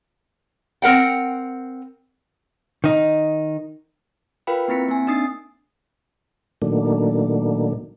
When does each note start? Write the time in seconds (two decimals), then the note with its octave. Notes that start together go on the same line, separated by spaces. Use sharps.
0.82 C4 A#4 F#5 G5
2.84 D#3 D#4
4.47 F4 A#4 B4 F5 G5 B5
4.68 A#3 C4 E4 B6 C#7
4.89 A#3 C4 G#5
5.07 D4 D#4 D#6 A6 C7
6.62 A#2 D#3 F#3 A3 A#3 D4